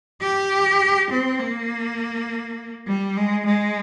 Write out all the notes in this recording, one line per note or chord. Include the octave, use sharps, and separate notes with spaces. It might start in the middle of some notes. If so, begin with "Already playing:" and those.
G4
C4
A#3
G3
G#3
G#3